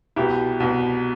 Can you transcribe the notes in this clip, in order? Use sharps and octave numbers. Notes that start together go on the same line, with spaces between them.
C2 B2 E4 G4
C2 B2